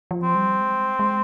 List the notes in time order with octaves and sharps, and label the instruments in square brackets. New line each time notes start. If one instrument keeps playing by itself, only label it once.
[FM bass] F3
[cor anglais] C4
[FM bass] G3
G#3
G#3